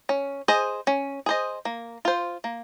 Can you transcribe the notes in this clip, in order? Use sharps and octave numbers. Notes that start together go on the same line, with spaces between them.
C#4
G#4 C5 D#5
C#4
G#4 C5 D#5
A#3
F4 C5
A#3